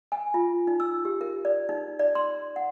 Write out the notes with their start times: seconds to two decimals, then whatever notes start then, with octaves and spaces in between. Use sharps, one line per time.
0.12 G#5
0.34 F4
0.67 D#4
0.80 E6
1.05 G4
1.21 A#4
1.45 D5
1.69 D#4
1.99 D5
2.15 C6
2.56 F#5